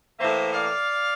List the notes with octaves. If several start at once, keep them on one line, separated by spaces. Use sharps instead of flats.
A2 E3 A#3 C5 E5
D5 F5